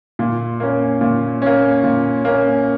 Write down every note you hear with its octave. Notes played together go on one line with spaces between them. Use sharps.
A#2
A#3 C#4
A#2
A#3 C#4
A#2
A#3 C#4